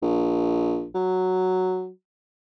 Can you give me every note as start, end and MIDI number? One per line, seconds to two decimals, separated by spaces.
0.02 0.86 34
0.95 1.89 54